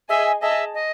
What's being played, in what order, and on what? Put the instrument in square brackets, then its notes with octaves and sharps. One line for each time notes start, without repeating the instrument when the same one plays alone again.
[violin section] G#4 D#5 G#5 [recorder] E5
[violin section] G#4 D#5 A5 [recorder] E5
[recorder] D#5